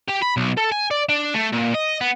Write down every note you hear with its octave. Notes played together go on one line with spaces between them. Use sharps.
G4
B5
B1
A4
G#5
D5
D4
A3
A#2
D#5
B3